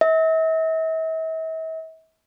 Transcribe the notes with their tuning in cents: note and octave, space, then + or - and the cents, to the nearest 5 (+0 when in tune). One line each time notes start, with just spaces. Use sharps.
E5 -40